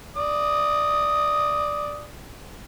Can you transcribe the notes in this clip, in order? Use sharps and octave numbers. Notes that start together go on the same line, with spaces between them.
D5 D#6